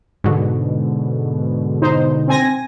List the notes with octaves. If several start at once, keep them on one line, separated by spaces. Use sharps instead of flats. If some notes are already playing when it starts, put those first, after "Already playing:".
G#2 B2 D3
D#4 C5
C4 G#5 A#6